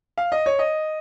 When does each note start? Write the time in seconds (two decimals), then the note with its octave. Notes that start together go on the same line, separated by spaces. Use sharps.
0.18 F5
0.32 D#5
0.46 C#5
0.59 D#5